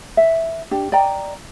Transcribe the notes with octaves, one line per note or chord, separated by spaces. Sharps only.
E5
D4 G4
D5 D#5 G5 A#5